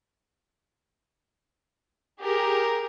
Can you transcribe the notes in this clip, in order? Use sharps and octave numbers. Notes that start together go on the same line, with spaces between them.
G4 G#4 A#4